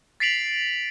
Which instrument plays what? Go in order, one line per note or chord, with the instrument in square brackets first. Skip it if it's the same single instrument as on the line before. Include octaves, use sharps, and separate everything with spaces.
[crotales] A6 B6 C7 D7 F7 F#7